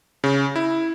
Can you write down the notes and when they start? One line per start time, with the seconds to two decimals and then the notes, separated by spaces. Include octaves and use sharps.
0.24 C#3
0.56 E4